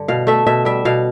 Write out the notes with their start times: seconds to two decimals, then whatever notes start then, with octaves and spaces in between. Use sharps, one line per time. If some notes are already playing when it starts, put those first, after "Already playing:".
Already playing: G2 D3
0.08 B2 F5
0.27 A3 E5
0.47 B2 E5
0.65 G3 E5
0.85 B2 F5